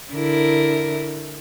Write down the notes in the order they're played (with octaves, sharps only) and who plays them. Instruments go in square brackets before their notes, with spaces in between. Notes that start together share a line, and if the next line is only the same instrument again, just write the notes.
[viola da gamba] D3 E4 A#4